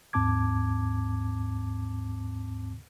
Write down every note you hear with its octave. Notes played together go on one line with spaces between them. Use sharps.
D#2 G#2 C4 A5 D6 G#6